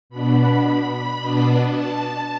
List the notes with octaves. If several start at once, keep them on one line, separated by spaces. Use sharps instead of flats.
B2 B3 D4 B5
B2 B3 D4
A5